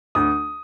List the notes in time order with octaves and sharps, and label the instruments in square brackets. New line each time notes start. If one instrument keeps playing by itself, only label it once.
[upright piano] D2 D#6